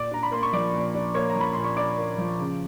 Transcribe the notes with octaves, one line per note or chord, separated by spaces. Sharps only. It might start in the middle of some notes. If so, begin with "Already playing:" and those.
Already playing: A#2 D5 D6
D4 A#5
B5
A#3 C6
C#6
F3 D5 D6
A#2
D4
A#3 C#5 C#6
A#5
F3
B5
A#2 C6
C#6
D4 D5 D6
A#3
F3
C#3